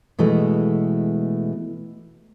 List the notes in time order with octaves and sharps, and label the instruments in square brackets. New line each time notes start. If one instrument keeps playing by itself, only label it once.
[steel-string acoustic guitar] B2 E3 G#3 A3